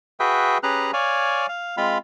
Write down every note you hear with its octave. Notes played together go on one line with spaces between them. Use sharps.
F#4 G#4 B4 E5 G5
C#4 G4 G#4 B4 A#5 F#6
C#5 D5 F5 G#5
F5
G#3 C4 F4 F5 B5